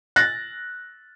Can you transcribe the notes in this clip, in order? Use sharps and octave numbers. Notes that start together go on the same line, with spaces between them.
F#6 A6 A#6